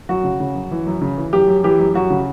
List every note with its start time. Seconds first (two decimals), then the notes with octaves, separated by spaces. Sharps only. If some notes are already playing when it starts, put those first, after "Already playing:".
0.09 F#2 F#4
0.24 C#3
0.40 C#3
0.55 F#2
0.71 E3
0.86 F#2
1.01 C#3
1.17 E3
1.33 F#2 G4
1.48 F#2
1.64 E3 G4
1.79 F#2
1.94 F#2 F#4
2.10 C#3